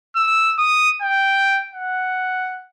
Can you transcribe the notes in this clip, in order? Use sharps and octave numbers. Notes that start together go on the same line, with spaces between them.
E6
D#6
G5
F#5